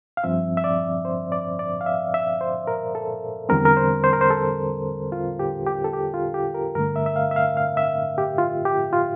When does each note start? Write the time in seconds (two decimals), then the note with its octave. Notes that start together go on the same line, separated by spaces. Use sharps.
0.17 F5
0.24 G2 F3 C4 E5
0.57 E5
0.64 D5
1.05 C5
1.32 D5
1.59 D5
1.81 F5
1.86 E5
2.14 E5
2.41 C5
2.67 A#4
2.95 A4
3.49 E2 D3 G3 C4 A#4
3.65 A#4
3.77 C5
4.04 C5
4.13 A#4
4.21 C5
4.31 A4
5.12 F4
5.39 G4
5.66 G4
5.84 A4
5.93 G4
6.14 F4
6.34 G4
6.54 A#4
6.75 G2 D3 A3 A#4
6.96 E5
7.06 E5
7.16 F5
7.31 E5
7.36 F5
7.57 F5
7.77 E5
8.18 G4
8.38 F4
8.65 G4
8.93 F4